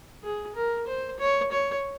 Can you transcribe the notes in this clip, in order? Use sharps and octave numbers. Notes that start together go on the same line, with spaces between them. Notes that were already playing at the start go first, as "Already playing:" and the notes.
G#4
A#4
C5
C#5
C#5